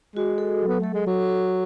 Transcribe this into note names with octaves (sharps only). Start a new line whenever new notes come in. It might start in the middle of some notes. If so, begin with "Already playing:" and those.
G#3 F#4
A4
F#3
B3
A3 A4
G#3
F#3 A4
A4